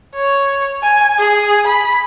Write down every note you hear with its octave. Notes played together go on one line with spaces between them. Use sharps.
C#5
G#5
G#4
B5